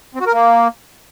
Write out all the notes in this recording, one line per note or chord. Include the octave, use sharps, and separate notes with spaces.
C4
F#4
A#4
A#3